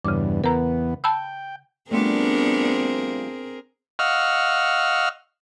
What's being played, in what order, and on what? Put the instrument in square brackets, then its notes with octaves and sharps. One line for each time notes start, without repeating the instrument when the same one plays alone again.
[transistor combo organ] E2 G2 [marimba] C#3 D6
[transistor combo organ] E2 B3 [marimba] A#4 A#5
[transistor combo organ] G5 [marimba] A5 B5 E6
[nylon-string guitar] F3 G3 A3 [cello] B3 D4 [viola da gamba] C4 G#4 A#4
[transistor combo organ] D#5 F5 F#5 C#6 E6 F6